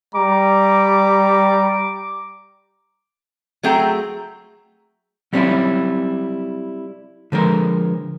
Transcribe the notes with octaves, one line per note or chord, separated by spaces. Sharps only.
G3 A#5 D6
F#3 A3 C4 G#4 G5 A#5
F#3 G3 C4 C#4 E4 F4
D3 F3 G#3 A#4